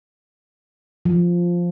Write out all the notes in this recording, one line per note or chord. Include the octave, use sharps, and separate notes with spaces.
F3